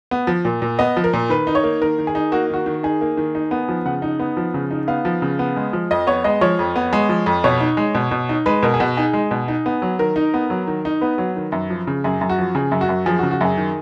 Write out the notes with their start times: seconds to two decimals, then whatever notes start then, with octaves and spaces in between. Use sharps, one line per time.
0.11 B3
0.27 F3
0.45 A#2
0.62 A#2
0.79 B3 D#5
0.97 F3
1.04 A#4
1.13 A#2
1.29 D#3 B4
1.47 D#4
1.55 C#5
1.64 A#3
1.81 D#3 A#4
1.98 D#3
2.07 G#4
2.15 D#4
2.32 A#3 F#4
2.49 D#3 F#4
2.66 D#3
2.83 D#4 G#4
3.01 A#3
3.17 D#3
3.35 D#4
3.51 B3
3.68 F3
3.85 C#3 F#5
4.02 D#4
4.20 B3
4.37 F3
4.54 C#3
4.71 D#4
4.88 B3 F5
5.05 F3
5.22 C#3
5.39 B3
5.56 G#3
5.73 F3
5.91 F2 D#5
6.07 B3 C#5
6.24 G#3 D#5
6.41 F3 C#5
6.59 F2
6.76 B3
6.93 G#3
7.09 F3
7.26 F2
7.44 B2 C#5
7.60 D#4
7.77 G#3
7.95 B2
8.11 B2
8.29 D#4
8.46 G#3 B4
8.63 B2 A#4
8.74 G#4
8.80 B2 F#4
8.97 D#4 G#4
9.13 G#3
9.31 B2
9.48 D#4
9.66 B3
9.82 F#3
9.99 D#3 A#4
10.16 D#4
10.34 B3
10.50 F#3
10.67 D#3
10.85 D#4
11.01 B3 B4
11.18 F#3
11.36 D#3
11.52 F#2
11.70 F3
11.87 C#3
12.04 F#2 G#4
12.21 F#2
12.29 F#4
12.38 F3
12.55 C#3 G#4
12.72 F#2
12.81 F#4
12.89 F#2
13.06 F3 G#4
13.19 F#4
13.23 C#3
13.31 F#4
13.41 F#2 G#4
13.57 D#3